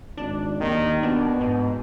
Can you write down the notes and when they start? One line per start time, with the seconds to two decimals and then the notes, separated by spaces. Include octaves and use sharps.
0.17 G#1 D4
0.61 D#2 D#3
1.03 B2 B3 D4
1.41 G#2